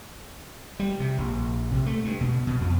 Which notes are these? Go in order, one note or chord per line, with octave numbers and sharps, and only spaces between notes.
G3
C3
A#1
C3
A3
G2
B2
B2
F2